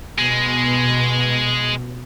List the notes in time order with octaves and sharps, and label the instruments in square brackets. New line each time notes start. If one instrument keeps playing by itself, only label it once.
[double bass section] B2 [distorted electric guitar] G#3